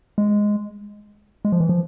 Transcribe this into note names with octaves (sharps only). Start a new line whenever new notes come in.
G#3
G#3
F3
E3
F3